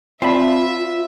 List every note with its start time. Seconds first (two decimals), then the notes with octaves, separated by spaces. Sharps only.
0.22 C4 F4 C5 D5 E5 A5 B5